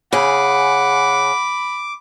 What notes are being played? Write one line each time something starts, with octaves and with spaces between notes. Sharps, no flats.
C#3 G#4 F#5 B5 D6